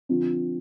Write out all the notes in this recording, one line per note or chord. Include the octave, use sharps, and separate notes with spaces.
D3 F3 C4 F4